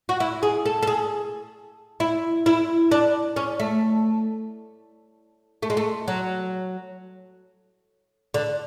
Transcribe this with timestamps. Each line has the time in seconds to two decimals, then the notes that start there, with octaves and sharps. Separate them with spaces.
0.09 F#4
0.20 E4
0.43 G#4
0.66 A4
0.83 A4
0.87 G#4
2.00 E4
2.46 E4
2.91 D4
3.36 C#4
3.60 A3
5.63 A3
5.70 G#3
5.77 A3
6.08 F#3
8.34 D3